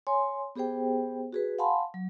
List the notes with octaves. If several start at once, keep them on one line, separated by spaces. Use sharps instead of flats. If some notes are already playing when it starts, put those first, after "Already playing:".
C#5 G#5 C6
B3 G4 G#4 C5 G5
F#4 G#4 B4
F5 F#5 G#5 A5 B5 C6
F#3